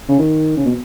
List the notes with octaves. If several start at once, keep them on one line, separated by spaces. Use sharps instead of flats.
C#3
D#3
C#3
B2